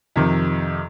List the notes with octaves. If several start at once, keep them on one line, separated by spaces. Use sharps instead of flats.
F2 C3 D#3